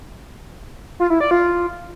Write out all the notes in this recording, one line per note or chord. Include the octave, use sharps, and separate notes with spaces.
F4
E4
D5
F4